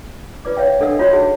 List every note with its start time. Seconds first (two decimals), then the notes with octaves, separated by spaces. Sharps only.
0.45 F4 B4 D5 D6
0.57 C#5 E5 F5 G5
0.80 D4 A4 A#4 D#5 F#5 E6
0.99 F4 F#4 C#5 E5 C6
1.13 D#4 G#4 F#5